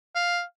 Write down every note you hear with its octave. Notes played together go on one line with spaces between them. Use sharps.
F5